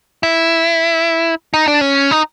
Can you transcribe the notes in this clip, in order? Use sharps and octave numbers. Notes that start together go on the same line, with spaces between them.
E4
D#4
D4
C#4
D#4